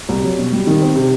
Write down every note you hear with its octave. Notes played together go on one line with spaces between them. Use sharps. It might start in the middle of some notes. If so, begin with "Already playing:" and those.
C2
F#3
B2
G3
D#3
C4
C3